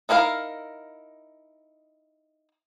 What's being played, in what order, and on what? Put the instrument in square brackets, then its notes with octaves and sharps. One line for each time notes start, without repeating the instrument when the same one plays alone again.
[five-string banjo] D#4 E4 A#4 B4 F5